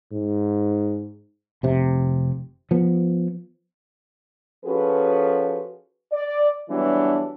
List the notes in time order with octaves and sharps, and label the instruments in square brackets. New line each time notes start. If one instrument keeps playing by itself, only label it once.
[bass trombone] G#2
[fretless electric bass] F1 C3
F3 B3
[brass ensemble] F3 C#4 F#4 G#4 A4 B4
D5
E3 F#3 G3 B3 D4